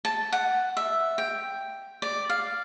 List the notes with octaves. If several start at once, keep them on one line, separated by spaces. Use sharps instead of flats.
A5
F#5
E5
G5
D5
F5